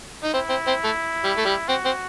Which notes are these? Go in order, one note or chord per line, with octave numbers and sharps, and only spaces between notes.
D#4
C4 E4
C4
C4
A3
G3
A3
G3
C4 F#4
C4